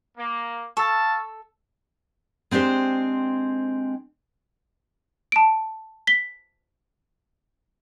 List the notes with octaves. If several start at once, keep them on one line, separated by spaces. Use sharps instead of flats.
A#3
A4 F5 A5 C#6 E6
G#3 C4 D4 G4 C5
A5 D7
B6 G7